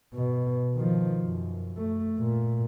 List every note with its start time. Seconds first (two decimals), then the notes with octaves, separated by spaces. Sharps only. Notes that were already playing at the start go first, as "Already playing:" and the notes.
0.14 B2
0.75 D#3 F3
1.22 F#2
1.78 A3
2.20 A#2